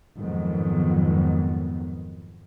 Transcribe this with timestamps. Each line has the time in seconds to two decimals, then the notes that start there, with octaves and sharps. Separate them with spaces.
0.18 F2 G#2 D#3 F#3 B3